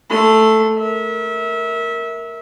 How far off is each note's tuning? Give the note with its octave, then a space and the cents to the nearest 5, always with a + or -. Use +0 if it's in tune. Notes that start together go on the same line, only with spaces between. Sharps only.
A3 +0 C6 -35
A#4 +0 E5 -25